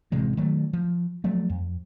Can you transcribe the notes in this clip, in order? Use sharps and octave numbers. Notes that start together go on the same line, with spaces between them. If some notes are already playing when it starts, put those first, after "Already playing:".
A1 C3 E3 G#3
D#3 F#3 A3
F3
F3 F#3 A3
F2